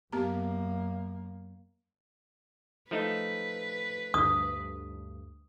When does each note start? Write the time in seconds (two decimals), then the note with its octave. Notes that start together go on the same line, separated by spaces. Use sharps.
0.13 F#2 A#3 B3 G4 A#5
2.91 F3 A3 D#4 B4
4.14 D2 G2 D#6